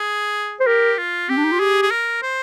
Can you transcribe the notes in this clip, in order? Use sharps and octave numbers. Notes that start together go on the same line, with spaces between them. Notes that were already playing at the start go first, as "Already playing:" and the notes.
Already playing: G#4
C5
G4 A#4
F4
C4 G4
D4
D#4
F4
G4 G#4
G#4
A#4
C5